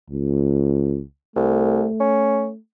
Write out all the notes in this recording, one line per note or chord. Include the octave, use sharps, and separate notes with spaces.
C#2
C2 A3
C#4